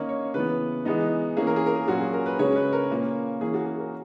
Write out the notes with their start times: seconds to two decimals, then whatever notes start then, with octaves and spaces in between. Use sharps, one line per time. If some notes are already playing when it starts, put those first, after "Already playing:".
Already playing: D#3 A#3 C#4 D#5
0.09 C#5
0.34 C#3 E3 B3 B4
0.85 E3 G#3 B3 D#4
1.37 E3 A#3 C#4 G#4
1.47 A#4
1.56 G#4
1.66 A#4
1.76 G#4
1.88 A#2 F#3 C#4 F#4
2.00 G#4
2.13 A#4
2.26 B4
2.39 C#3 G#3 C#4 C#5
2.56 B4
2.73 A#4
2.90 A#2 A#3 C#4
3.41 E3 A#3 C#4 G#4
3.54 F#4
3.66 G#4
3.79 A#4